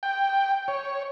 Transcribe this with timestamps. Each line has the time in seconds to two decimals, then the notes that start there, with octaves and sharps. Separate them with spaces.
0.03 G5
0.68 C#5